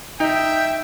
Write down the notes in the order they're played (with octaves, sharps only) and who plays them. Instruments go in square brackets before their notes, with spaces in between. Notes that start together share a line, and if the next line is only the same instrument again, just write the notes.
[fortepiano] D#4 [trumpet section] E5 G5